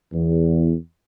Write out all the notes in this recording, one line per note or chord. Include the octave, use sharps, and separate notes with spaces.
E2